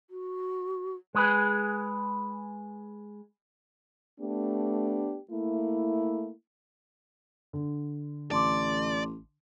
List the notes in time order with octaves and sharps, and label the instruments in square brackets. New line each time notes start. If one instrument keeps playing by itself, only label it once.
[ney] F#4
[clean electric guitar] G#3 G#4 B4
[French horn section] A3 B3 D4 G4
A3 A#3 E4
[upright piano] D3
[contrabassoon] A1 [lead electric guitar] D5 [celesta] A5 C6 D6